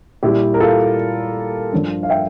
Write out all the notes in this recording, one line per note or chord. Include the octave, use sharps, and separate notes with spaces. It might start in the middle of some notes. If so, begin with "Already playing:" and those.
A#2 G3 E4 G4
A#4
F4 A4
G2 F3
F5
E5 G5